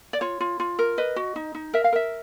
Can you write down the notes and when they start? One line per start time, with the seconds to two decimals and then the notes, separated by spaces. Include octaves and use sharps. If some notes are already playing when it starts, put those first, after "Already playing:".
0.13 D5
0.21 F4 C#5
0.40 F4
0.60 F4
0.79 A#4
0.98 B4 D#5
1.16 F#4
1.36 D#4
1.55 D#4
1.74 A#4 E5
1.84 F5
1.93 A#4 E5